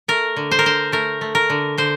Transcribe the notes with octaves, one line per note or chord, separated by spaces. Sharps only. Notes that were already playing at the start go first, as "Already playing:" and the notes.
A3 A#4
D3
C5
A#4
D3 C5
A3 A#4
A3
A#4
D3
D3 C5